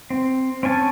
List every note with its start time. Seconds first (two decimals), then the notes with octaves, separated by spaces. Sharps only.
0.10 C4
0.63 C4 C#4 G#5 A5